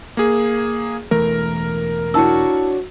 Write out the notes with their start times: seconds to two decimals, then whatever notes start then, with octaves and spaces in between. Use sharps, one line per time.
0.17 A#3 G#4
1.11 E1 E3 A3 A#4
2.14 D4 E4 F#4 C#5 A5 E6